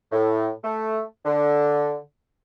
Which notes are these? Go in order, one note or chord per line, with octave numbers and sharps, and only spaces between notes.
A2
A3
D3